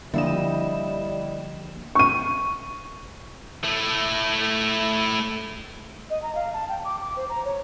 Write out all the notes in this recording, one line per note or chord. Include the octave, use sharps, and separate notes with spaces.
D3 F3 G3 A#3 D4 E4 D#5 E7
C#6 D#7
A3 E4
D#5
A#5
F5
A5
G5
D6
D6
C5
A#5
C#5